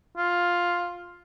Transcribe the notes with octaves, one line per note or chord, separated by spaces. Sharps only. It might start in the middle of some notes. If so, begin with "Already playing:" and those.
F4